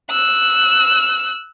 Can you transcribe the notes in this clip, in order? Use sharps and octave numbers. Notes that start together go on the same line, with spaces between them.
E6 F#6